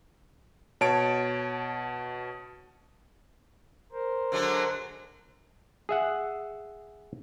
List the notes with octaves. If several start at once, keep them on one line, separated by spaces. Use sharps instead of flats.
B2 C#5 A5 D7
A#4 C5
D3 F#3 G#3
G#4 E5 F#5